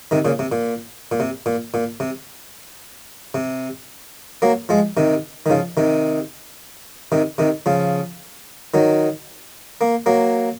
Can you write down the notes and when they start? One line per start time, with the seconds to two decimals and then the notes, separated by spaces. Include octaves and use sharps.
0.11 C3 D#3
0.25 A#2 C#3
0.39 C3
0.52 A#2
1.12 A#2
1.20 C3
1.46 A#2
1.74 A#2
2.00 C3
3.34 C3
4.42 F#3 A#3
4.69 F3 G#3
4.97 C3 D#3
5.46 D#3
5.50 C#3 F3
5.77 C3 D#3
7.12 C3 D#3
7.38 C3 D#3
7.66 C#3 F3
8.74 D#3 F#3
9.81 A#3
10.06 F#3 A#3